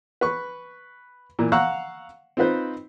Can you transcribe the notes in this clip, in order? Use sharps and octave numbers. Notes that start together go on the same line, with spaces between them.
B4 C#6
A#2 E3
F5 F#5 A#5 C#6 E6 F#6
C4 D#4 F4 B4 C5